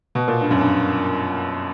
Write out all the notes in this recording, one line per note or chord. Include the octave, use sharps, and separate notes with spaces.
B2
A#2
G2
F#2
G2